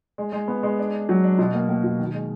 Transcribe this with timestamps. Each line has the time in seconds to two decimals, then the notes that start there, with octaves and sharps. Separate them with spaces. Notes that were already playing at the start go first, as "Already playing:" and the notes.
0.18 G#3
0.32 G#3
0.48 B3
0.63 G#3
0.79 D4
0.93 D4
1.09 F#3
1.24 D4
1.39 B2
1.54 A#3
1.69 A#3
1.84 B2
1.99 D#3
2.14 G#3